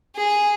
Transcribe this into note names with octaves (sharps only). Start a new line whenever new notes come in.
G#4